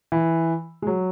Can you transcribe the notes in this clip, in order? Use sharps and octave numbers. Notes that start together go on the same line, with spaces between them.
E3
G#3
F#3